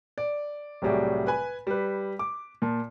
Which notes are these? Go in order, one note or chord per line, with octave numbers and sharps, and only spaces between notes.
D5
C2 A2 F#3 G3 G#4 D5
B4 G#5 B5
G3 B4
D6
A#2 A5